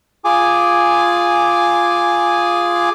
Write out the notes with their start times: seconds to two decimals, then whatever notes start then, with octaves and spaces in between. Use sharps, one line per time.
0.25 F4 G#4 G#5 D6